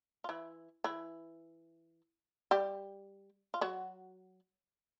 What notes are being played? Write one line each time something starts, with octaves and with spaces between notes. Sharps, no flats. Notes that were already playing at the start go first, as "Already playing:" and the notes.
F4
E3 E4
E3 E4
G3 G4
F4
F#3 F#4